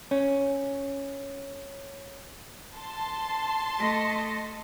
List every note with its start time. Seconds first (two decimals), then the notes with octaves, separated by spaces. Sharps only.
0.11 C#4 C#5
2.76 A5 C6
3.78 A3 D#5